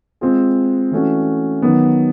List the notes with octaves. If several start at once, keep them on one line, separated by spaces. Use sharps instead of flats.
G#3 C4 F4 G#4
E3 A3 C#4 F#4
D#3 F#3 B3